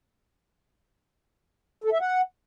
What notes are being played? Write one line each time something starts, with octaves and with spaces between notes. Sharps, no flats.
A4
E5
F#5